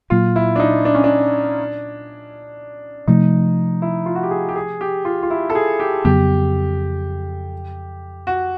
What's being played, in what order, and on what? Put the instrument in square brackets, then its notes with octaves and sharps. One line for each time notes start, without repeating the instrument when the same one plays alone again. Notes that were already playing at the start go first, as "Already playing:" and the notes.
[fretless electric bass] A#2 F#3 A#3 [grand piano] F4
[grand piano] E4
D4
D#4
D4
C#4
D4
[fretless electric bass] C3 F3 A3 [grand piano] D#4
[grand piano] E4
F4
F#4
G4
G#4
G4
G#4
G4
F4
F4
E4
A4
G#4
G4
[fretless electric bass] F2 C#3 F#3 B3 [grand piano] G4
[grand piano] F#4